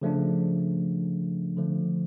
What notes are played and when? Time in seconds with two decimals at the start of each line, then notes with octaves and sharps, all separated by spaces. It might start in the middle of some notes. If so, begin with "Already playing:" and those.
0.02 C#3 F3 A3 D4
1.57 D3 F3 A3